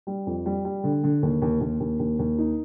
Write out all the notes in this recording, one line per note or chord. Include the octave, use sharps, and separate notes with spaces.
G3
F2
G3
G3
D3
D3
D#2
D#2
D#2
D#2
D#2
D#2
D#4